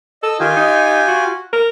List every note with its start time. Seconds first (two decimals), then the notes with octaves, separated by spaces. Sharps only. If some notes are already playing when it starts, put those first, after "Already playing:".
0.23 A4 D#5 E6
0.40 D#3 F4 G4 G#5
0.56 D#4
1.08 F#4
1.53 A#4